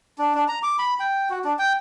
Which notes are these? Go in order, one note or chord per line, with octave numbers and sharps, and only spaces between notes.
D4
D4
A#5
D6
B5
G5
F#4
D4
G5